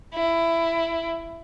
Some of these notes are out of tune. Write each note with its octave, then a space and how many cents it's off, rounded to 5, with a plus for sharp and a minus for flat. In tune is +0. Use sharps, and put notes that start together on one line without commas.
E4 +15